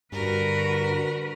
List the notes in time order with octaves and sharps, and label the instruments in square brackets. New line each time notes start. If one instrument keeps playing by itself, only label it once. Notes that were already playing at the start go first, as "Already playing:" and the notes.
[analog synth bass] G2 [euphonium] D3 [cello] F#4 B4 [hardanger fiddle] A#4